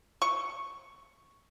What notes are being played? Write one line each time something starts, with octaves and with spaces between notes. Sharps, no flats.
C#6